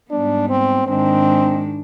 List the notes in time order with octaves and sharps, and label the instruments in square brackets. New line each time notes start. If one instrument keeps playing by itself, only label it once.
[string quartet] G#2 G3 B3 [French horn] D4
[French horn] C4
[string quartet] G#2 D#3 G#3 D4 [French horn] C4